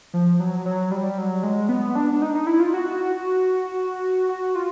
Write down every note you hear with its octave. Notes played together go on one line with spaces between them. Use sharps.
F3
F#3
F#3
G3
F#3
G#3
B3
D4
D4
D#4
D#4
E4
F4
F#4
F#4
F4